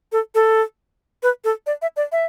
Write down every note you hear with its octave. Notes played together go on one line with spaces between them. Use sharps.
A4
A4
B4
A4
D5
E5
D5
E5